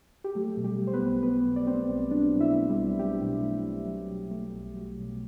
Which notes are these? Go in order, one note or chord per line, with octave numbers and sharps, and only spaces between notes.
G4
F#3 A3 A4
B2
G3 G4
A3
C5
B3 B4
B1
F#3 B3 B4
B2
D5
A3 C4 C5
B1
F#3 D4 D5
B2
E4 E5
A3
G3 G4
B1
F#3 G3 G4
B2
A3
B1
F#3
B2
A3
B1
F#3
B2